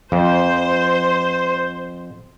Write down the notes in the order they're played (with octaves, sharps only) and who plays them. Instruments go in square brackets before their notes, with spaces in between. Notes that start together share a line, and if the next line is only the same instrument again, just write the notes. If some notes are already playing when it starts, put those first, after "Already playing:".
[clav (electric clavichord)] F2 [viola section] C5